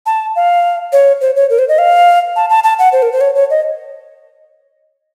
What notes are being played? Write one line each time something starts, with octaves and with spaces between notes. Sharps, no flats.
A5
F5
C#5
C5
C#5
A#4
C5
D#5
F5
A5
A5
A5
F#5
C5
A#4
C5
C#5
C#5
D#5